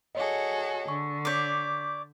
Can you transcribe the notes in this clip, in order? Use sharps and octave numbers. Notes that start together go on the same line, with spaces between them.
F#4 G#4 A4 C#5 D#5
D3 C#6
C#5 D5 D6 G6 B6